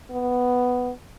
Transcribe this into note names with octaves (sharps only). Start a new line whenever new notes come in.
B3